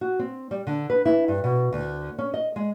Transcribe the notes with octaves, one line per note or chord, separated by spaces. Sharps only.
F#4
C4
G3
D3
B4
E4
G2
B2
D2
C#4
D#5
G#3